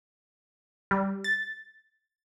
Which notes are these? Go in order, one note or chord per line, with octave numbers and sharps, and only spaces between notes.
G3
A6